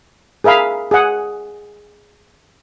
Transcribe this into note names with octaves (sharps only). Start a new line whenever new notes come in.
G#4 A#4 E5 F5 B5
G#4 F#5